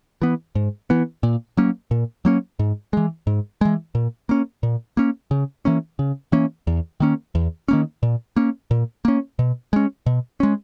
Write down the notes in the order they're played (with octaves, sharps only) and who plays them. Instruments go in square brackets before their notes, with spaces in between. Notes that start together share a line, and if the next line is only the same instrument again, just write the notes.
[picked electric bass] E3 B3
G#2
E3 B3
A#2
F#3 A#3 C#4
A#2
F#3 A#3 C#4
G#2
E3 G#3
G#2
E3 G#3
A#2
A#3 C#4
A#2
A#3 C#4
C#3
E3 A#3 C#4
C#3
E3 A#3 C#4
E2
D#3 A#3 C#4
E2
D#3 A#3 C#4
A#2
A#3 C#4
A#2
A#3 C#4
B2
G#3 C#4
B2
G#3 C#4